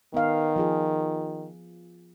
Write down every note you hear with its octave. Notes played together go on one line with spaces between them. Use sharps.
D#3 B3 F5
F3 F4 G#4